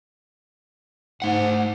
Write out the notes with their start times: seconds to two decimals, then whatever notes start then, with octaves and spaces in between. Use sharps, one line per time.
1.22 G#2 A3 F#5